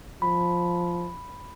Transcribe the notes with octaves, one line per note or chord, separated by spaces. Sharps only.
F3 B5